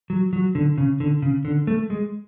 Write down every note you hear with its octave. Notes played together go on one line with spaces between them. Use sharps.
F#3
F#3
D3
C#3
D3
C#3
D3
A3
G#3